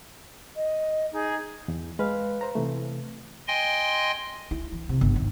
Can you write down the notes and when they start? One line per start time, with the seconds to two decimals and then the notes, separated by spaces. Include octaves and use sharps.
0.55 D#5
1.12 D#4 G#4
1.68 E2
1.99 G#3 B4 F5
2.41 C5 A#5
2.55 C3 E3 A3
3.48 D#5 G5 G#5 C6
4.51 E4
4.72 E3
4.89 C3
5.01 G1 G2
5.16 D#2